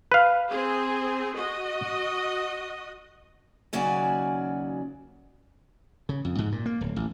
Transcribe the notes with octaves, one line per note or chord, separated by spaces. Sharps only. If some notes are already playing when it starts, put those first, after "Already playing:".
B4 F5
C4 G#4
F#4 D#5
D#2 C#3 F#3 F#4 D5 G#5
C#3
F2
G#2
A#2
A#3
D1
A1